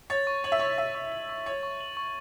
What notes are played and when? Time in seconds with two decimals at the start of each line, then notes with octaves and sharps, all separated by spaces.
0.10 C#5 A6
0.27 C#6
0.44 C#5 F#7
0.52 E5
0.59 C#5 C#6
0.78 E5 A6
0.95 C#6
1.12 F#7
1.29 C#6
1.46 C#5 A6
1.63 C#6
1.81 F#7
1.97 C#6